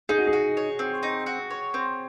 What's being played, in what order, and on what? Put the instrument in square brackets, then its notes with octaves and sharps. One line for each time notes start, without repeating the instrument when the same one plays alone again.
[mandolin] D#4 [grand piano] G#4
[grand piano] F#4
G#4
[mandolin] F#4
C#5
C4
D#4
F#4
C#5
C4